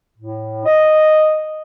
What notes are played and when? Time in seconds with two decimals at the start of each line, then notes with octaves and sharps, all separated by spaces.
0.18 A2
0.66 D#5